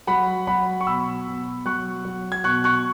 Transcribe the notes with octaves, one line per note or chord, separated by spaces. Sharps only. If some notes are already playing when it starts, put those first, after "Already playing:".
F#3 F#5 B5
F#3 F#5 B5
C#6
B2 B5 E6
B2
F#3 C#6 F#6
F#3
G#6
B2 C#6 F#6
C#6 F#6